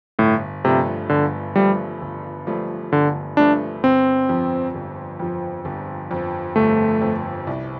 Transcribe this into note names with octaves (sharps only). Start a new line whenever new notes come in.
G1 A2
G2 C3 F3 A3
G1 D3
G2 F3 G3 A3
G1
G2 F3 A3
G1 D3
G2 F3 A3 D4
G1 C4
F2 F3
G1
F2 F3
G1
F2 F3
G1 A3
F2 F3
C2